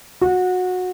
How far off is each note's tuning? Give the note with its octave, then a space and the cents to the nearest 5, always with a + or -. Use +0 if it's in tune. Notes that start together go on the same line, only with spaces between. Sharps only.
F#4 -20